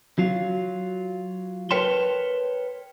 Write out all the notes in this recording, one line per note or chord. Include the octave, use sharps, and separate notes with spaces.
F#3 F4
A#4 B4 C#5 G5 A5 C6